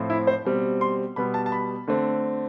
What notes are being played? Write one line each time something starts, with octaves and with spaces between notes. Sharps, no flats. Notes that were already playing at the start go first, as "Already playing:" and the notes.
Already playing: A2 F3 C4
E4
C5
B2 G3 C4
C6
B2 G3 B3 B5
A5
A5
B5
D3 A3 C4